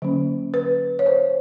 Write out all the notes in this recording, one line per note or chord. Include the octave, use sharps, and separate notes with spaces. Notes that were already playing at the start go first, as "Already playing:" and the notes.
D3 F#3 A#3 C#4
B4
C#5
C5